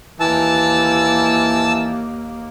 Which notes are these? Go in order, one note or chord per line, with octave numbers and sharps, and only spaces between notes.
D#2 E3 A#3 A5 E6